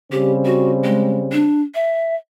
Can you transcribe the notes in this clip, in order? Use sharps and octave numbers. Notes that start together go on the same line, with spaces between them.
C#3 G3 C4 G4
F#4
G#3
D4
E5